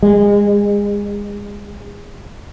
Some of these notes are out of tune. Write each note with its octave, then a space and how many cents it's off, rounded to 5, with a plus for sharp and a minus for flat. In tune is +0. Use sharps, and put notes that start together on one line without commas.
G#3 -30